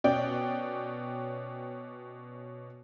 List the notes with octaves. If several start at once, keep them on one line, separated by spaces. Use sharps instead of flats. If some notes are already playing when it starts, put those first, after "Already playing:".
B2 C#4 D5 G5